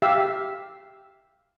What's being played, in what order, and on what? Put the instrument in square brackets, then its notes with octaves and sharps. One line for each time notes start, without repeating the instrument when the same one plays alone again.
[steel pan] G4 E5 F5 E6